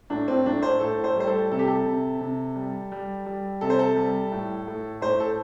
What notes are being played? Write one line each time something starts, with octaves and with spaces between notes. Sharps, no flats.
A2 D4
C4
A2 D4
C5
A2 A4
C5
G3 C5
A4
C3 A4
G4
A4
C3
C3
G3
G3
G3
C3 A4
C5
A4
G3
A2
A2
A2 C5
A4